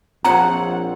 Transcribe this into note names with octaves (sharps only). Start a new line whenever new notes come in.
A#1 C4 F4 C#5 F#5 A#5